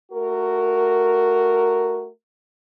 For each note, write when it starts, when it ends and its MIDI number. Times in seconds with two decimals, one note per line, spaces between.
0.12 2.10 57
0.12 2.10 66
0.12 2.10 70